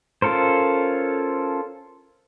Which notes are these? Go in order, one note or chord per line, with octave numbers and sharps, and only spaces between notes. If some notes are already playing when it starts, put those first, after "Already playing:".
C#4 F4 A4 A#4 C5